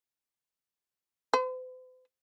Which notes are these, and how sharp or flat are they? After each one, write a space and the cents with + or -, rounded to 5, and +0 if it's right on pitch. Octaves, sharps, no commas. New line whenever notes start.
C5 -45